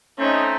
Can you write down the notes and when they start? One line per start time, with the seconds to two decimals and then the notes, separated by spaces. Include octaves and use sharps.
0.19 A3 C4 C#4 D#4